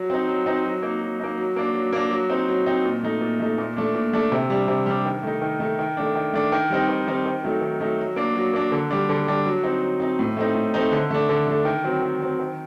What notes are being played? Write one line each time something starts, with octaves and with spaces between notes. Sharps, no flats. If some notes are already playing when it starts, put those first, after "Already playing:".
Already playing: F#3
C4 D#4
F#3
C4 D#4
F#3
A#3 D#4
F#3
A#3 D#4
F#3
A#3 D4
F#3
A#3 D4
F#3
C4 D#4
F#3
C4 D#4
A#2
A3 D#4
A#2
A3 D#4
A#2
A3 D4
A#2
A3 D4
C3
G3 D4
C3
G3 D4
D#3
A3 D#4
D#3
A3 D#4
D#3
A3 D4
D#3
A3 D4
D#3
G3 C4 D#4
D#3
G3 C4 D#4
D#3
F#3 A3 D#4
D#3
F#3 A3 D#4
F#3
A#3 D4
F#3
A#3 D4
D3
G3 D4
D3
G3 D4
F#3
C4 D#4
F#3
C4 D#4
A2
A3 C4 D#4
A2
A3 C4 D#4
D3
A3 D4
D3
A3 D4
D#3
F#3 C4
D#3
F#3 C4
D#3